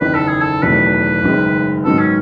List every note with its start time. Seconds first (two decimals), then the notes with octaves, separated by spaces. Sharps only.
0.01 F#1 E2 D#3 B4
0.14 A4
0.28 G#4
0.41 A4
0.62 E1 E2 D#3 F#3 A3 B4
1.22 F#1 F#2 D#3 G#3
1.84 G#2 D#3 F#3 B3 A4
1.99 C#4